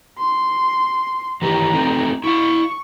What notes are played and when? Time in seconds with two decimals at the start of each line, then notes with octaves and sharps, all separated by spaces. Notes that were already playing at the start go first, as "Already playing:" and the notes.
0.18 C6
1.42 D#3 E3 G4 A#5
1.73 A3 C4 D#4
2.24 E4 F5 C#6